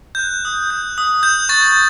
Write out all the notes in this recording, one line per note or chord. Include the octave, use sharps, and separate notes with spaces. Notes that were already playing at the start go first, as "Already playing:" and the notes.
F#6 G6
D#6
G6
D#6
G6
C#6 A6